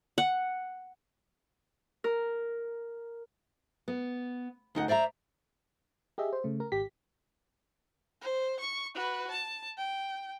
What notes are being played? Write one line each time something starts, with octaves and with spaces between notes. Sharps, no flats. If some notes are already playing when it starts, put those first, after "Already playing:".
F#5
A#4
B3
D2 D#4 F#5
C5 D5 E5 F5 A#5
G4 G#4 D#5 E5
C5
C#3 A3
A#4
G#1 G4 B6
C5
C#6
F#4 B4
A5
G5